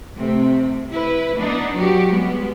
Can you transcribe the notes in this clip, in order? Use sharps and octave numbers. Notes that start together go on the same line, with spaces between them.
C3 A3 C4
E4 B4
B3 D4 D#4
F#3 F#4 G4
G3 G#3 B3